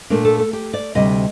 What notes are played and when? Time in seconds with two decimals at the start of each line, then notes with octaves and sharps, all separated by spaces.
0.10 A#2 A3 D4 A#4
0.25 A4
0.39 A4
0.53 G4
0.73 D5
0.95 D2 C3 G3 D4 D#5